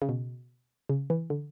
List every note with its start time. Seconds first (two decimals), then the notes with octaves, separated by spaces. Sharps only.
0.02 C#3
0.09 B2
0.89 C#3
1.10 E3
1.30 D3